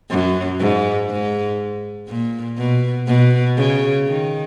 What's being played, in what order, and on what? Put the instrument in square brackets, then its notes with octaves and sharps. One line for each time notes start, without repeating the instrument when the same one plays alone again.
[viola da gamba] F#2
G#2
G#2
A#2
B2
B2
C#3
D#3